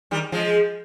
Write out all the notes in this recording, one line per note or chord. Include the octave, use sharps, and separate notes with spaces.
D#3 G3
F3 G#3